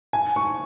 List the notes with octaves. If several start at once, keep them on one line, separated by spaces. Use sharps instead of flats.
G#5
C#6